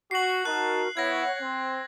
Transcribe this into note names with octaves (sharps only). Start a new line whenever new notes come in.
F#4 C7 F#7
D#4 F#4 A#4 A5 F#6
B3 E4 C#5 E5 F#5 G#6 A#6
C4 C6